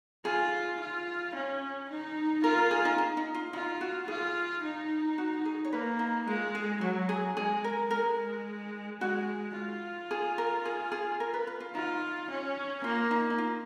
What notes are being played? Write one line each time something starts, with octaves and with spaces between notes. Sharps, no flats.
F4 G#4
F4
C#4
D#4
F4 A#4
A#4
G#4
D#4
D#4
D#4
F4
D#4 F4
F#4
F4 G#4
D#4
F#4
G#4
C#5
A#3 B4
D#4
G#3 F4
G#4
F#3 F#4
G#4
G#3 G#4
A#4
G#3 A#4
G#3 F#4
F4
G#4
A#4
G#4
G#4
A#4
B4
B4
F4
D#4 F4
C#4
A#3 F4
D#4
D#4
F4